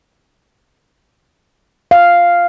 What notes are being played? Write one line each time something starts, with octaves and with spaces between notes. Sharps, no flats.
F5